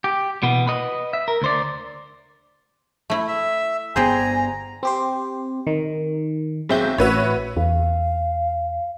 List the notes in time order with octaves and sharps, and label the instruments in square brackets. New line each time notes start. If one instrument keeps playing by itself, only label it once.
[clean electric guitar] G4
B2 E3 B3
B4 D#5
E5
A#4
D2 C5 D5
[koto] A3 E4
[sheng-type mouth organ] E5
[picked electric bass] G1 B3 [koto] G4 G#4 C5 [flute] G#5 [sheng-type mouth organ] A#5
[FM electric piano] C4 G4 C5
D#3
[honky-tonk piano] B1 E5 [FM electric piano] G#3 C4 G6
[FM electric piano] A1 E5 [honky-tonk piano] F#4 B4 C#5
[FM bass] E2 [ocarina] F5